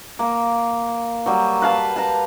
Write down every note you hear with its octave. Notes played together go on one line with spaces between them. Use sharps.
A#3
F#3 G3
B4 F5 A5
A5 A#5